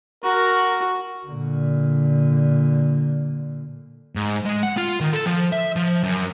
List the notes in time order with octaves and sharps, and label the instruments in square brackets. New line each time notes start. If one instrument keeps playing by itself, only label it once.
[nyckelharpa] F#4 [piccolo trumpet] A#4
[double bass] A#2 D3
[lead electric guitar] G#2
G#3
F#5
F4
D#3
A4
F3
E5
F3
F#2